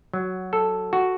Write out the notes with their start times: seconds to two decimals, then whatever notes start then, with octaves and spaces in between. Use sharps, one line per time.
0.13 F#3
0.53 A4
0.93 F#4